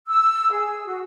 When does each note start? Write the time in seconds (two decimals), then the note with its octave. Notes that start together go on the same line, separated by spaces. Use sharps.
0.08 E6
0.51 G#4
0.85 F#4